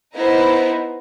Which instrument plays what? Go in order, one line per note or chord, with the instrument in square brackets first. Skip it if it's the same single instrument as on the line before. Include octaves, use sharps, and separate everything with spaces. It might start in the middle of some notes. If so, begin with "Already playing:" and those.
[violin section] B3 D#4 E4 C5 A#5